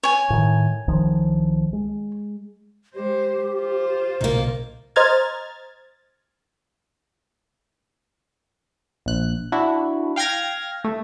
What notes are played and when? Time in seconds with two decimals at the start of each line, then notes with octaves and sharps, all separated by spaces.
0.03 C#5 G#5
0.30 A2 D#3
0.88 C2 D#3 F3
1.73 G#3
2.95 G#3 G4 C5
3.55 F4 C5
4.21 B1 A#2 C#3 A#3 D#4
4.96 C5 D#5 A#5 F6 G#6 A6
9.06 A#1 F#6
9.52 D4 E4 F#4
10.16 F5 G5 F6 G#6 A#6
10.84 A3